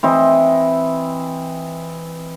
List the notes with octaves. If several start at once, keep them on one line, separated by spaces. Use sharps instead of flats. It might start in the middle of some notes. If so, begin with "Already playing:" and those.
E3 C4 D#5